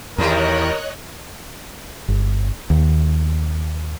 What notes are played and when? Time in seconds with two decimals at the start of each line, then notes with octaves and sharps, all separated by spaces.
0.18 E2 A2 D#3 G3 A#4 C#5 D#5 F#6
2.08 G1
2.70 D#2